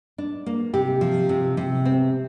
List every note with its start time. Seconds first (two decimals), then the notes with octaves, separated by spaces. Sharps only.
0.18 D4
0.46 A#3
0.74 C3 G4
1.01 F3
1.29 C3
1.57 C3
1.85 C4